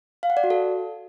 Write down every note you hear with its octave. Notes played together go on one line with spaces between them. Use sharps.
F5
F#5
D5
F#4
A4